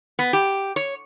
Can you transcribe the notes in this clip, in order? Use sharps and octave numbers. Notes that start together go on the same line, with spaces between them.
B3
G4
C#5